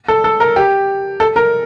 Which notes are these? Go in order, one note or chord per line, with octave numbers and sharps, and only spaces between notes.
A4
A4
A#4
G4
A4
A#4